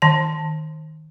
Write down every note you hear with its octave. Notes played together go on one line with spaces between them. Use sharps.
D#3 A5